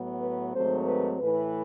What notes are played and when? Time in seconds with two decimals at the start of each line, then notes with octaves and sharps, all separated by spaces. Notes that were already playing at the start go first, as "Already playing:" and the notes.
Already playing: A2 F#3 B3
0.21 B4
0.54 G#2 D#3 F#3 A3 C4 C5
0.87 B4
1.20 A2 E3 A3 B4